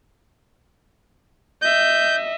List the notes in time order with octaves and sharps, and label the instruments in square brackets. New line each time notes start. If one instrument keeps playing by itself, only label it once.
[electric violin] D#5 E5 [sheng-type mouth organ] G6